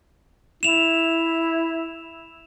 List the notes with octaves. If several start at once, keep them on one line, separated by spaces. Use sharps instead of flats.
E4 E7 F7